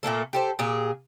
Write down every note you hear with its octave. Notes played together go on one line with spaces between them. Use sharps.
A#2 A3 A#3 A4
G4 A4 C5
A#2 G4 G#4